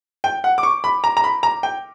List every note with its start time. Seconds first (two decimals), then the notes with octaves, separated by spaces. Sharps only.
0.24 G5
0.44 F#5
0.58 D6
0.63 C#6
0.84 B5
1.04 A#5
1.17 A#5
1.24 B5
1.43 A#5
1.63 G5